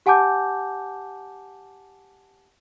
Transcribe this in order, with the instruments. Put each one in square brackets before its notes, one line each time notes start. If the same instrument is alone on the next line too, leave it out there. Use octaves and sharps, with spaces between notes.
[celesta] G4 F#5 G#5 A5 D6 G6